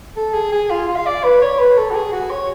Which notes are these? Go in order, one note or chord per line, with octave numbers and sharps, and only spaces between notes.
A4
G#4
G#4
F4
F4
F5
D5
B4
C#5
B4
A4
F#4
G#4
F#4
C#5